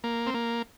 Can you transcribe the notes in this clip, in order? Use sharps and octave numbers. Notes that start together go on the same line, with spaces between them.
A#3
C4
A#3